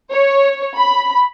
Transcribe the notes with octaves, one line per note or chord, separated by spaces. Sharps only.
C#5
B5